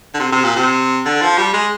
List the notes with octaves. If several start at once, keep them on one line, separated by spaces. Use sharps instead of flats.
D3
C3
C3
A#2
C3
D3
F3
G3
G#3